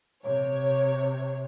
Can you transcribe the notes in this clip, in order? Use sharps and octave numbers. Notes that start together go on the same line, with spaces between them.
C3 C#5